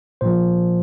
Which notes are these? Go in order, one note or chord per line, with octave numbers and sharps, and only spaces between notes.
A#2 F3 C5